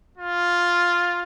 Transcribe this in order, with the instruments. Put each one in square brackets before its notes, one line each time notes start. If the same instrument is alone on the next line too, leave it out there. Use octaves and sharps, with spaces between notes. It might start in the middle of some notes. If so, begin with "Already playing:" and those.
[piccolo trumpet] F4